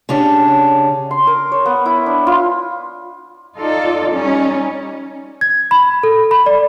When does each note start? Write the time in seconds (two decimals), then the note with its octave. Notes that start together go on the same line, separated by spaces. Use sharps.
0.09 C#3 C#4 D4 G4
1.11 C6
1.27 A#4
1.52 C#5
1.66 B3
1.86 E4
2.06 D4
2.27 F4
3.57 D#4 F4 A4 D5
4.12 G3 C#4 D#4
5.41 G#6
5.71 B5
6.03 A4
6.31 B5
6.46 D5